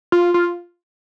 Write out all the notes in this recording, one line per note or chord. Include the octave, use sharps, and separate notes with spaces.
F4
F4